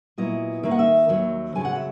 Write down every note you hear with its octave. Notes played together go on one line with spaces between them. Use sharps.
A#2 F#3 B3 E4 D#5
D#3 A#3 D#4 E5
F#5
E5
D#2 D#3 F#3
F#2 C#3 F#3 G#5
F#5
E5